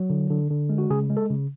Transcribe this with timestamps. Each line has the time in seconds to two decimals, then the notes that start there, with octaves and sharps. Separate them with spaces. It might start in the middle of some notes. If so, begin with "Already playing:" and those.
Already playing: F#3
0.10 D3
0.30 D3
0.51 D3
0.69 G#3
0.78 F#4
0.90 C#3 G#4
1.10 G#3
1.17 A4
1.30 C#3